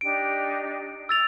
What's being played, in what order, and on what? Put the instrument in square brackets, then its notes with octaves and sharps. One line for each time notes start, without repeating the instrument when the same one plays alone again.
[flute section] D4 D#4 G4 [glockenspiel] D7
[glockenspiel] E6 A6 F7